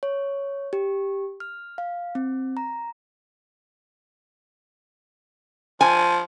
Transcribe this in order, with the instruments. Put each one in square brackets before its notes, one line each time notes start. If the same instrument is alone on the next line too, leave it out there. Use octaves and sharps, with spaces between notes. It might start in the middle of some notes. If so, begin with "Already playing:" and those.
[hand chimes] C#5
G4
F6
F5
C4
A#5
[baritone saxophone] F3 [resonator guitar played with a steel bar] G#5